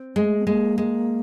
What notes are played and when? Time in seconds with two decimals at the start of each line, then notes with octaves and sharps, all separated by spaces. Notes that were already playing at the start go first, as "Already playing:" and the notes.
Already playing: C4
0.15 G#3 A3
0.40 B3
0.47 G#3 A#3
0.78 G#3